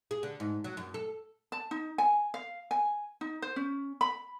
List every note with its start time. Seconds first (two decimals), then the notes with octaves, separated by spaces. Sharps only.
0.11 G#4
0.23 D3
0.40 G#2
0.64 F#3
0.77 F#2
0.94 A4
1.52 A5
1.71 D#4
1.98 G#5
2.34 F5
2.71 G#5
3.21 D#4
3.42 C5
3.56 C#4
4.01 B5